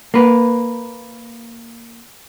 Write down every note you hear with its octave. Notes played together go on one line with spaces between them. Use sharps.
A#3 B4